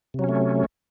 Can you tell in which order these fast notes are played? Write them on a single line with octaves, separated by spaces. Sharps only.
C3 F#3 C#4 A3